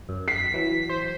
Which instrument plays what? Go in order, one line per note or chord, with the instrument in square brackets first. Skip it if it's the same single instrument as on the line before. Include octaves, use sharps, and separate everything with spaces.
[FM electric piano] F#2
[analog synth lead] B6 [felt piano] C7
[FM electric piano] E3 F#3
[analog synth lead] C5